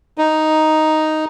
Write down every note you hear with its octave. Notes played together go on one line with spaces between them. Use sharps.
D#4